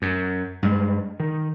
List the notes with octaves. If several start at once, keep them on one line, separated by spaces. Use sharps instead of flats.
F#2
G2 G#3
D#3